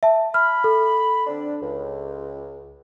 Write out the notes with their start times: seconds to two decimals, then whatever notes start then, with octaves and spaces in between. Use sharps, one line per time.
0.03 E5 A5
0.34 B5 F6
0.64 A4
1.27 D3 C4 D4
1.62 C#2